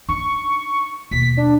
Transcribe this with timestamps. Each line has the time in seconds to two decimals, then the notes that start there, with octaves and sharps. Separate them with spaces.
0.09 D4 D#4 C#6
1.11 D#2 B2 B6
1.37 D4